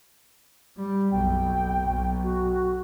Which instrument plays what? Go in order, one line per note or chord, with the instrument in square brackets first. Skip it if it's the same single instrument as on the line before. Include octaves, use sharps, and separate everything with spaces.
[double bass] G3
[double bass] F#1 B1 [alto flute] G5
[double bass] B1
[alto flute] F#4